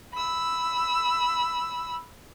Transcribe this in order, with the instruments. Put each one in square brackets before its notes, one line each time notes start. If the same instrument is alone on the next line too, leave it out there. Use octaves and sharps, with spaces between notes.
[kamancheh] B5 E6